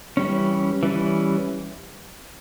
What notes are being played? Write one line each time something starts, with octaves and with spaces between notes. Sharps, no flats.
E3 G3 C#4
E3 G3 C#4